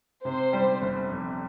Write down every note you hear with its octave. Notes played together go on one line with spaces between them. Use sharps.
C3 C5
G3
G1
F2